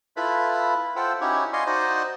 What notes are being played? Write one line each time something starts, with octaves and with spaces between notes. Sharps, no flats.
E4 F4 A4 B4 B5
F4 A4 C5 F#5 G5 E6
C#4 D#4 E4 F#4 G4 C#5
D5 D#5 F5 G#5 C6 C#6
D#4 F#4 C5 D5 D#5